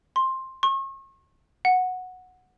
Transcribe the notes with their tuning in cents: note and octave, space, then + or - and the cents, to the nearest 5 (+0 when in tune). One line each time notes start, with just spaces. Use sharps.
C6 +10
C#6 -40
F#5 -10